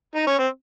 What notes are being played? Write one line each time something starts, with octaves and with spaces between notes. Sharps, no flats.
D#4
C#4
C4